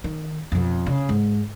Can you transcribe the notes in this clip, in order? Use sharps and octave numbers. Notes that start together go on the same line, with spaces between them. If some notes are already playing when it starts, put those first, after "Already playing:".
D#3
F2 B2
C#3
G#2